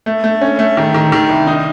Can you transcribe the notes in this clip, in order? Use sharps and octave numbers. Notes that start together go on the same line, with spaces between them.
A3
A3
C#4
A3
D#3
D#3
D#3
C2
D#4